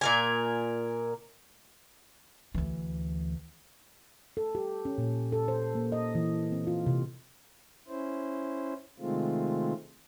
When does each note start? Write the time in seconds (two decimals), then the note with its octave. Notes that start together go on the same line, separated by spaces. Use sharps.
0.01 A#2 A#4 G#5
2.54 D2 E3
4.37 A4
4.55 G4
4.85 C#4
4.98 A#2
5.32 A4
5.48 C5
5.75 A#3
5.92 D#5
6.15 E3
6.52 C4
6.67 F4
6.86 C3
7.88 C#4 E4 C5
8.99 C3 D#3 G#3 A3 C4 F4